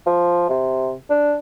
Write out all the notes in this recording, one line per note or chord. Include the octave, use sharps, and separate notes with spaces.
F3
C3
D4